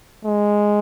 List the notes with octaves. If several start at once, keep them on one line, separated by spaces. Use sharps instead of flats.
G#3